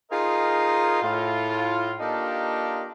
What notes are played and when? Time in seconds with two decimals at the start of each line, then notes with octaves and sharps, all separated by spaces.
0.11 D#4 F4 G#4 A#4 C5 D#5
1.02 A2 F4
1.99 A#3 D4 D#4 F4 G4 A4